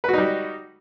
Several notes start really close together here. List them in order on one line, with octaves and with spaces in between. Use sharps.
B4 F#4 D#4 G3